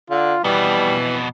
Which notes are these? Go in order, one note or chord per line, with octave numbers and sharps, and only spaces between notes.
D3 F4
F2 B2 E3 G3